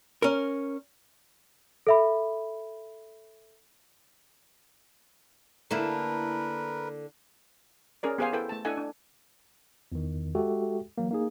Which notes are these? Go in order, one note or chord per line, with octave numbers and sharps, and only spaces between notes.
C#4 A#4
A4 E5 B5
D3 A#3 E4 A#4 B4
C#4 G#4 A#4 D5
B3 G4 G#4 C5 F5 G#5
E4 A4 B4 G5
A3 A5
D4 E4 A4 D#5 F#5 G#5
D4
E2 D#3
G#3 F#4 G4 A4 E5 G5
E3 F#3 A#3
A#3 D#4 G#4